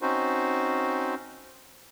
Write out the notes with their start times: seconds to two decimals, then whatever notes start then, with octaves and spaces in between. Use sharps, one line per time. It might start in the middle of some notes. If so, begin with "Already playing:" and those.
0.02 C4 C#4 D#4 F#4 C5